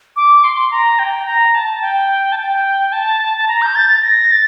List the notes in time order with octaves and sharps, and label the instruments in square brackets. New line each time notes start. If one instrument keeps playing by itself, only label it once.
[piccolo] D6
C6
A#5
G5
A#5
A5
G5
A5
G5
A5
A5
A#5
G6
A6
A6
A#6
A6